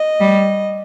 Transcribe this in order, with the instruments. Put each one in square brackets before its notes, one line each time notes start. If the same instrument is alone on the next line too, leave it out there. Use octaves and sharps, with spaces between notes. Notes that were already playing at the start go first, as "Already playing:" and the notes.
Already playing: [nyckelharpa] D#5
[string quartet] G3